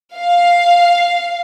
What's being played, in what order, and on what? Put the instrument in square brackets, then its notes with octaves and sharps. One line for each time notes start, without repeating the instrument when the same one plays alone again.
[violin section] F5